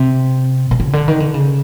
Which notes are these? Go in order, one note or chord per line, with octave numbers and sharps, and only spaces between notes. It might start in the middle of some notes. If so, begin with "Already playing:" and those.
Already playing: C3
C3
C#3
D3
D#3
D3
C#3